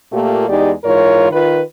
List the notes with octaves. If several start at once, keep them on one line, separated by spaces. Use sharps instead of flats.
A#2 A3 A#3 F4 G4
E2 G#3 D#4 G4 D5
G#2 E3 F4 A#4 C#5
D#3 F4 B4